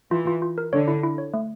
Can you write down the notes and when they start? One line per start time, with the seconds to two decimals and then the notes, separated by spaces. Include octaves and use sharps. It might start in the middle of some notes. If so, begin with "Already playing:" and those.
0.11 E3 F4
0.27 F4
0.42 F4
0.58 A#4
0.73 D3 C#5
0.88 E4
1.04 E4
1.18 C#5
1.34 A3